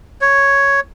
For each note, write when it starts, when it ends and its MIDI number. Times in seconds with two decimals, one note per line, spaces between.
0.21 0.80 73